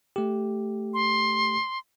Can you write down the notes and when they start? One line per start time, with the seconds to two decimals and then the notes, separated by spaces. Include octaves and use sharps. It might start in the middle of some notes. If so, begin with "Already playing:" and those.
0.16 A3 G4
0.94 C6